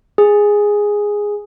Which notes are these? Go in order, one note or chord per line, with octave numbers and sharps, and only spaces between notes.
G#4